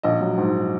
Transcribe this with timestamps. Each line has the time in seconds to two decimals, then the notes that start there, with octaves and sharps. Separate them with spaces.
0.03 A#1 D#5
0.21 F#3
0.37 G#2